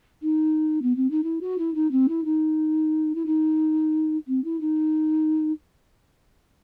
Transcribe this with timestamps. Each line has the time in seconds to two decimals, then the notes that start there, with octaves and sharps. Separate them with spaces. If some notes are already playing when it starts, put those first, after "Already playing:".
0.22 D#4
0.82 B3
0.96 C4
1.11 D#4
1.23 E4
1.41 F#4
1.58 E4
1.75 D#4
1.91 C4
2.08 E4
2.24 D#4
3.15 E4
3.26 D#4
4.27 C4
4.44 E4
4.60 D#4